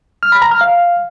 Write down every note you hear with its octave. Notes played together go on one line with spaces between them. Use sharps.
F6
B5
A#5
F6
F5